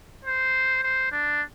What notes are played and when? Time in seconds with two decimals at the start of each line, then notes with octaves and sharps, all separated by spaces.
0.25 C5
0.83 C5
1.12 D4